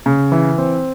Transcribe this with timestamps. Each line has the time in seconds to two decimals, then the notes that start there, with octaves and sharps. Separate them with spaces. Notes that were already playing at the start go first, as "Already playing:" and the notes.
0.06 C#3
0.32 E3
0.58 C4